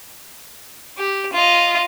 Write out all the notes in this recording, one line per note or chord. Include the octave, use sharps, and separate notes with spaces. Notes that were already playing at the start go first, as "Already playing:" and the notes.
G4
F4 D#5